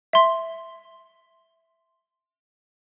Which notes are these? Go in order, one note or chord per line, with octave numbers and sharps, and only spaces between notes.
E5 C6